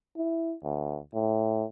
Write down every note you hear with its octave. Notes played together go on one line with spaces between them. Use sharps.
E4
D2
A2